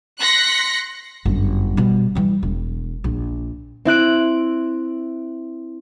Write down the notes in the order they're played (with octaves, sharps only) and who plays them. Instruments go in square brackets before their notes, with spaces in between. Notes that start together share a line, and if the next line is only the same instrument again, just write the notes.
[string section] C6 F#6 A#6 B6 C#7
[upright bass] G1 F#2
B2 G3
E3 G3
E1
A#1
[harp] C4 E4 F#6 D7